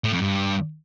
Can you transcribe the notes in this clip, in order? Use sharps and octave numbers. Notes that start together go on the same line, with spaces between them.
A2
F2
G2